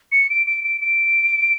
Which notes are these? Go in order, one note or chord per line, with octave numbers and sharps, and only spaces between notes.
C#7
D7
D7
D7
D7